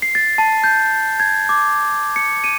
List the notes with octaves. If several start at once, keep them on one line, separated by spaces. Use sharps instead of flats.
C7
A6
A5
G6
G#6
D6
C#7
D#7